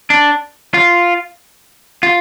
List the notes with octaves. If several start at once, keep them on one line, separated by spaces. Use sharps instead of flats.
D4
F4
F4